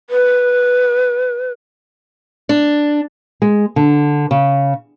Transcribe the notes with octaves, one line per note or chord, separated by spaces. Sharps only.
B4
D4
G#3
D3
C#3